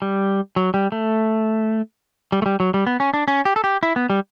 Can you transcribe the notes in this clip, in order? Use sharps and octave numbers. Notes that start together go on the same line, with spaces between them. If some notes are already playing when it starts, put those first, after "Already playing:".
G3
F#3
G3
A3
G3
A3
G3
F#3
G3
B3
C#4
D4
C#4
G4
A4
G4
E4
B3
G3